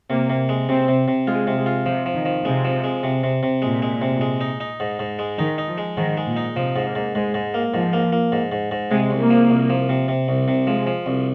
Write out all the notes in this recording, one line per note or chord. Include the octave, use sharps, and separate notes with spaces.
C3 A#3
C3
G#3
C3 C4
C3
C3
G#3 F4
C3
G#3
F4
C3 F3
F3
D#3
F3
C3 G#3
F3
G#3
C3
C3
C3
A#2 G#3
G#3
C3
G#3
D#4
D#4
G#2
G#2
G#3
D#3 D#4
D#4
F3
G#3
G#2 D#3
G#3
A#2
D#4
C3 F3
G#2
A#3
G#2
G#2 G#3
G#2
A#3
G#2 F3
A#3
A#3
G#2
G#2
G#2
C3 G#3
C2
A#3
F3
C2
F3
C3
C3
C2
C3
F3 G#3
F3
C2